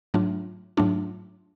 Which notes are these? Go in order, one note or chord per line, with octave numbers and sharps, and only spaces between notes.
G#2 F#3 A3 D4 F4
G#2 F#3 A3 D4 F4